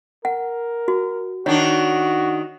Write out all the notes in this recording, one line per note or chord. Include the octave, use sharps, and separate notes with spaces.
A#4 F#5
F#4
D#3 D4 F#4 C#5